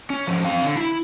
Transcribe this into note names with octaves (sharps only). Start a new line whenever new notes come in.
C#4
F3
C4 F5
D3
E4